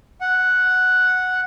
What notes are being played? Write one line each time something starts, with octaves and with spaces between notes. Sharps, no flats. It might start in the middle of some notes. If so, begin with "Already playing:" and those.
F#5